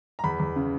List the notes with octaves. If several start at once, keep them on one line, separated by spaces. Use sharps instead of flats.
A#5
E2 B5
E2
C#3